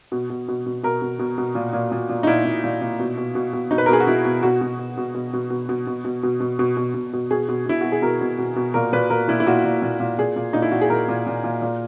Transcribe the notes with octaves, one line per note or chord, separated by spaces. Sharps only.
B2
B2
B2
B2
B2 A#4
B2
B2
B2
A#2
A#2
A#2
A#2
D#4
A#2 E4
A#2
A#2
A#2
B2
B2
B2
B2
B2 D#4
B4
A#4
B2 G#4
F#4
B2 E4
B2
B2 F#4
B2
B2
B2
B2
B2
B2
B2
B2
B2
B2
B2
B2
B2
B2
B2
B2 G#4
B2
B2 E4
B2 F#4
G#4
B2 A#4
B2
B2
B2
A#2 A#4
A#2 B4
A#2 A#4
A#2 E4
E4
A#2 F#4
A#2
A#2
A#2
A#2 G#4
A#2
A#2 D#4
E4
A#2 F#4
G#4
A#2 A#4
A#2
A#2
A#2
A#2